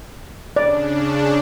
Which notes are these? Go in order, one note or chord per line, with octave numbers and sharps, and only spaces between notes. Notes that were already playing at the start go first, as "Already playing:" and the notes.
C#3 D4 D5